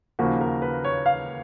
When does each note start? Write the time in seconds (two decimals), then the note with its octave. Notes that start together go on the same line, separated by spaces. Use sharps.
0.19 D#2 C#3 F3 A#3 F#4
0.41 A#4
0.62 B4
0.84 C#5
1.06 F5